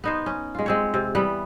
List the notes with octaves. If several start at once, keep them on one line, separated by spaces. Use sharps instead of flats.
B3 D#4 C5
C#4
G#3 F4
G#3 C4 C#5
C3
E3 G3 B3